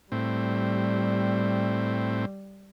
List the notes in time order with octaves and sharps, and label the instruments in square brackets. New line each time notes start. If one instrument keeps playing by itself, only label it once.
[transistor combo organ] A2 C4 [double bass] G3